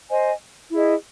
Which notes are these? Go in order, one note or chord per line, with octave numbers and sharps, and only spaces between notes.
C5 D#5 G#5
E4 G#4 D#5